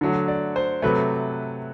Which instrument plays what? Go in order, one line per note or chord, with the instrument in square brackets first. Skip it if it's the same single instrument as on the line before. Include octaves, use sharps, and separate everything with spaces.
[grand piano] D3 F#3 A3
D5
C5
C3 F#3 A3 B4